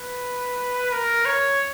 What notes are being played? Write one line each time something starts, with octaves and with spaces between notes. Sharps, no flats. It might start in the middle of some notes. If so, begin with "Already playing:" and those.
Already playing: B4
A#4
C#5